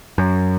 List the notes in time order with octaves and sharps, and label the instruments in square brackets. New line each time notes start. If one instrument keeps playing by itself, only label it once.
[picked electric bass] F#2